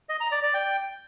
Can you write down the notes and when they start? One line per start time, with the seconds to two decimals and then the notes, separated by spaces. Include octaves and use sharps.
0.09 D#5
0.20 A#5
0.32 D5
0.43 D5
0.54 G5